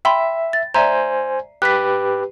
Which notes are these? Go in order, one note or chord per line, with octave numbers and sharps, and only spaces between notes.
E5 G5 B5 C6
A6
C5 D5 E5 G#5 A#5
G4 B4 F#6 B6